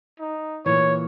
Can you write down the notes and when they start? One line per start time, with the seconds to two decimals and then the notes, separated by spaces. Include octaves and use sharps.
0.20 D#4
0.66 A#2 E3 C#5